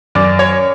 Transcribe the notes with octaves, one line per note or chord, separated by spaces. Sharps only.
F#2 D5
C#5